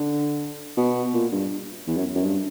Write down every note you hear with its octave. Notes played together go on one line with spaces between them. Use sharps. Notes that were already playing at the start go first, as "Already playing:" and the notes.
Already playing: D3
B2
A#2
G2
E2
F#2
F#2
G2